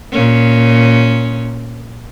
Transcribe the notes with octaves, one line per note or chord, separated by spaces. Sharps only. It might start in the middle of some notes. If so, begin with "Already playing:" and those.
A#2 C#4